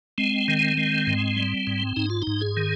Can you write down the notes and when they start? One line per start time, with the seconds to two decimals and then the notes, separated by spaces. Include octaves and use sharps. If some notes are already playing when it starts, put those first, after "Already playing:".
0.18 G#3 C4
0.48 D#3
0.77 G#3
1.07 G#2
1.36 G3
1.67 G#2
1.96 G#2 D#4
2.10 F4
2.22 D#4
2.27 G#2
2.41 G#4
2.57 D#3